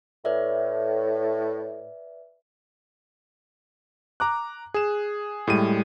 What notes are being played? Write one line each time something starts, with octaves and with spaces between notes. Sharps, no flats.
A2 B4 D5 E5
A#5 D6 F#6
G#4 E7
A2 G3 G#3 D#7